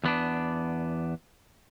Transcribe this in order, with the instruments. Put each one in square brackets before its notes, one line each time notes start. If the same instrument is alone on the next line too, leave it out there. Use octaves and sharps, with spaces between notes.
[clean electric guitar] E2 B3 D4